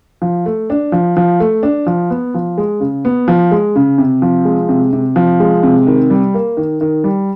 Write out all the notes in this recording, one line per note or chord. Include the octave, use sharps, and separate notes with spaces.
F3
A3
D4
F3
F3
A3
D4
F3
B3
F3
G#3
C#3
B3
F3
G#3
C#3
C3
F3
G#3
C3
C3
F3
G#3
C3
D#3
G3
A#3
D#3
D#3
G3